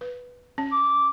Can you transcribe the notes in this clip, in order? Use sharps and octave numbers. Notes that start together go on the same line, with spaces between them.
B4
C#4
D6